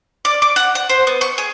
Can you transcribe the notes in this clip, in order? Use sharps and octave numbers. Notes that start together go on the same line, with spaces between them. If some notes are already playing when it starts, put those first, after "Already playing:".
D5
D6
F#5
F#5
C5
B3
C#6
G#4